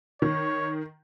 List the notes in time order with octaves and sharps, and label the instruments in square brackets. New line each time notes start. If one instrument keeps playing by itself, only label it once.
[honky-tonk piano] D#3 [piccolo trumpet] C#5